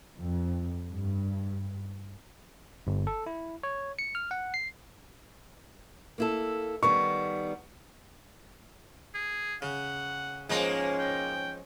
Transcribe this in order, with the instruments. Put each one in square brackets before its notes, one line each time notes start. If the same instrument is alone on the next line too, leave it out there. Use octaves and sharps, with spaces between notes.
[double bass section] F2
G2
[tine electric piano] G1
A4
E4
C#5
C#7
F6
F#5
C7
[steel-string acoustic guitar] A#3 E4 A4
[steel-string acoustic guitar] D#3 G3 B3 [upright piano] C#6
[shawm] G#4
[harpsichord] C#3 [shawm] F#5
[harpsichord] G#2 F3 D#4 [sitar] G#3 A#3 [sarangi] C#4
[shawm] G5